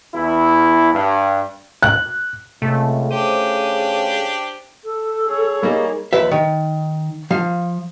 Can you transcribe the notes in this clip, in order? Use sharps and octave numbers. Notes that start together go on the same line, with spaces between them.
E2 E4
G2
F#6
C#2 C3 A3
C#3 D4 G4 C5 D#7
A4
G#4 C#5
G3 A#3 D#4
D#2 F3 B4 E5
D#3
F3 F5